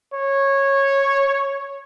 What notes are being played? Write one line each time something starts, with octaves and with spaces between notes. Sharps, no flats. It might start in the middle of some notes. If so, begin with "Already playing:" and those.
C#5